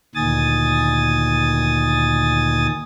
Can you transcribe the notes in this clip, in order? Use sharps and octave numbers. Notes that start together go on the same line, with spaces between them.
D2 A#2 D#3 G#5 D#6 A6